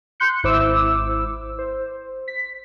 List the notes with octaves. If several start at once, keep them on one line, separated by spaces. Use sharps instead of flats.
C6 F#6 G6 C#7
G#1 E4 C5 D6 E6
C5
B6